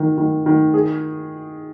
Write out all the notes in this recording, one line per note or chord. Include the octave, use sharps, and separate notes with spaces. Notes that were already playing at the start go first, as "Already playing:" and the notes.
Already playing: D#3
D#3
D#3
G#4